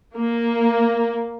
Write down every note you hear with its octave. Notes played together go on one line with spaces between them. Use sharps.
A#3